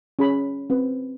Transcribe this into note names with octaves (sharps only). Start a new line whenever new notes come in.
C#4 G#4 B5
C4 B4